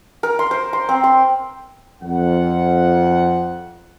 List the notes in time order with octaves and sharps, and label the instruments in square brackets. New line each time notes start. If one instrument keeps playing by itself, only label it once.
[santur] A#4
C6
C5
C6
C4
C6
[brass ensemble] F2 F#5